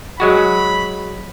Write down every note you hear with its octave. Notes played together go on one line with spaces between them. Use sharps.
F#3 G#3 F#4 B5